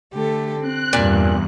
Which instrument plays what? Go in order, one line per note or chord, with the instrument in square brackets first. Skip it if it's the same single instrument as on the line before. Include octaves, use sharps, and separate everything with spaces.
[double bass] D3 [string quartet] A3 G4 A4
[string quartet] C4 [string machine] F#6
[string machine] E2 [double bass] G2 [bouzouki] A#2